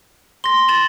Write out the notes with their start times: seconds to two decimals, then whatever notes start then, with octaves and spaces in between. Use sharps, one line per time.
0.44 C6 A#6 G7
0.68 A6 E7 F#7